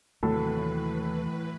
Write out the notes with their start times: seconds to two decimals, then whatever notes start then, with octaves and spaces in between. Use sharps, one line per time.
0.23 D#2 A2 C3 E3 F#3 A4 B4